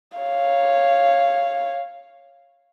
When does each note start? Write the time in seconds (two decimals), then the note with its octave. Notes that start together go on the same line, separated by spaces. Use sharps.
0.18 C#5 F5